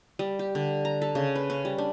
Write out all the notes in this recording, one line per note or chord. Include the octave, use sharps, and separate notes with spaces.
G3
G4
D3
A#5
A4
C#3
B4
C#4
G3
D4